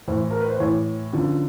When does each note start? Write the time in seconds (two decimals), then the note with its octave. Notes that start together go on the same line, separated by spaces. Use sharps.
0.08 A2 E3 C5
0.31 A#4
0.40 B4
0.50 C5
0.60 A2 E3 C#5
1.13 F#2 D3 F3